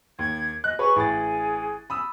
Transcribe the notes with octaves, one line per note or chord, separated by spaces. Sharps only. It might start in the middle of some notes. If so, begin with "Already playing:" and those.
D#2 G#6
D#5 F#6
G#4 B4 C#5 C#6
A1 G#4 A6
B5 D#6 E6